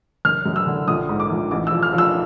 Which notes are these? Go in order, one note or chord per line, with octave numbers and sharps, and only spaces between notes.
F#1 F6
F#2
E6
D3
A#1 D#6
G#2
D6
A#1
A1 D6
F3 E6
F6
F3
E6